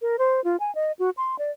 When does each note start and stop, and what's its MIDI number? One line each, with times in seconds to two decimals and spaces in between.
0.02 0.16 70
0.19 0.43 72
0.44 0.56 65
0.60 0.73 80
0.75 0.92 75
0.99 1.10 66
1.17 1.36 84
1.39 1.51 74